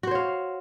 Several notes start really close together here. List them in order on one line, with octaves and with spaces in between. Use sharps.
F#4 C5 C#5 F5